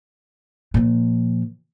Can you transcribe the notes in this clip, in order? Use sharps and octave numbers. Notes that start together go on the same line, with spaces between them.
A#2 F3